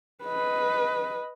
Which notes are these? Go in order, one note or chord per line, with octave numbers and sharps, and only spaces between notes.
B4 D#5